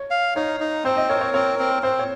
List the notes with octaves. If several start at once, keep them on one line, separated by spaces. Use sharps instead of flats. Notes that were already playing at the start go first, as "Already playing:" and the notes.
Already playing: C#5
F5
D#4 C#5
D#4
C4 C5
D#5
A#4 C#5
C#5
C4 C#5
C4
C4 C5
C#5